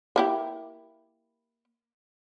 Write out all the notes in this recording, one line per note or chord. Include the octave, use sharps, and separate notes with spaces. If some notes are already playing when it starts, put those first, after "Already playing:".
A#3 E4 G4